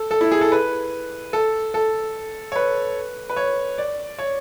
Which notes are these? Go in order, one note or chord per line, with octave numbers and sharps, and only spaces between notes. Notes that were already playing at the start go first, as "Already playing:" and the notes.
Already playing: A4
A4
E4
G#4
A4
B4
A4
A4
C#5
B4
B4
C#5
D5
C#5